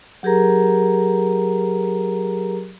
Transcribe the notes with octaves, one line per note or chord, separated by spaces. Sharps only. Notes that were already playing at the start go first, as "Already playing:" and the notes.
F#3 G4 G#4 A#4 A#5